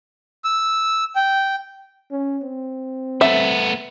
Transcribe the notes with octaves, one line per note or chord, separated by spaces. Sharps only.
E6
G5
C#4
C4
A3 B3 E5